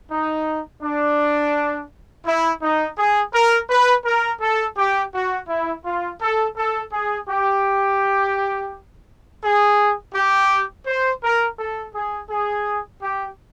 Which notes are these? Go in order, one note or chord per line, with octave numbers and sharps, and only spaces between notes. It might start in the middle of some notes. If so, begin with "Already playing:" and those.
D#4
D4
E4
D#4
G#4
A#4
B4
A#4
A4
G4
F#4
E4
F4
A4
A4
G#4
G4
G#4
G4
C5
A#4
A4
G#4
G#4
G4